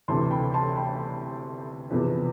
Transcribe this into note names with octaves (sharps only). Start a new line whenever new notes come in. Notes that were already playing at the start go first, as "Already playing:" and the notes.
D2 C3 E3 A5 C6
G5 B5
A5 C6
G5 B5
E2 C3 F3 B3